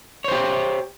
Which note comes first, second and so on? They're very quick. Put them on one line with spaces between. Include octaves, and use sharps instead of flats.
C#5 C5 G4